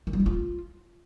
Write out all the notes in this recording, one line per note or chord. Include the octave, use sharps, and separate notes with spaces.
D#3
G3
D#4
F4